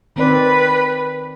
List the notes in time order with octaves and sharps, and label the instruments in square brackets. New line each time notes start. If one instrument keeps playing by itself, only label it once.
[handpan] D#3 C4 D5 [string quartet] B4